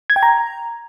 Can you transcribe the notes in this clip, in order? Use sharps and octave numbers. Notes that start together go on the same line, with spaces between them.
G#6
G5
A#5